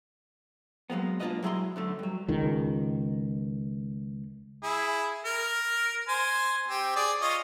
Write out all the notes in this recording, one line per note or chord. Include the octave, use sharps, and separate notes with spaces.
F#3 G#3 A#3 B3
G#3 A#3 D4 F4 B4 D#5
F#3 G#3 E4 G#4 A#5 C6
F#2 D3 A3
G2 F#3
C#2 D#3
E4 G#4
A#4
C5 G#5
C4 G4
G#4 D5
F4 C#5 D#5